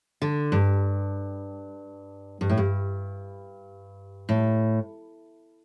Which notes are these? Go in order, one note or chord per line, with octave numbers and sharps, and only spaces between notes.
D3
G2
G2
A2
G2
A2